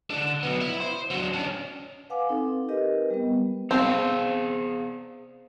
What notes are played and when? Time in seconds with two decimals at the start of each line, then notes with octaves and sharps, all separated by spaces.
0.10 D3 D4
0.43 F#3 B3
0.61 E4
0.80 C5
1.11 F#3 D4
1.33 C#4 D4
2.10 B4 F5 F#5 G#5 D6
2.29 C4 D#4 A4
2.68 G4 A#4 B4 D#5
3.10 G3 B3
3.71 B3 C4 G#4 F5